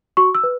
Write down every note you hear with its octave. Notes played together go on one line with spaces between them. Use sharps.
F#4 C#6
E6
B4